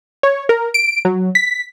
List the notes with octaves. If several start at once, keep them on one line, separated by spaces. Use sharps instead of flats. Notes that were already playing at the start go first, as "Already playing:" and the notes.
C#5
A#4
D7
F#3
B6